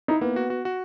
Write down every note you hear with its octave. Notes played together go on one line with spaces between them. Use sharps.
D#4 E4
A#3 B3
F#4
F#4
F#4